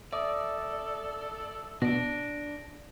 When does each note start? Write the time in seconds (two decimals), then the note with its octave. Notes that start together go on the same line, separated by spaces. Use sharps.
0.13 A4 D5 E5 D6 D#6
1.82 B2 D4 A#6 D7